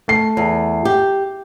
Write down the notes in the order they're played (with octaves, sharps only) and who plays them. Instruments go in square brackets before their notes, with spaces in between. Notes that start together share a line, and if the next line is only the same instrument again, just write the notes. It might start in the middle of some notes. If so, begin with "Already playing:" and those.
[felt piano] A3 C7
[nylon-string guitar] E2
G4